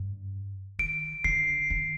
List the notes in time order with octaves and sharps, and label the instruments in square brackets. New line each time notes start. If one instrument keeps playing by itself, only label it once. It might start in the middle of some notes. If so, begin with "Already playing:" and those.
Already playing: [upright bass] G2
[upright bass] D#3 [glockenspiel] D7
[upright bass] D3 [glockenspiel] C7
[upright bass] D#3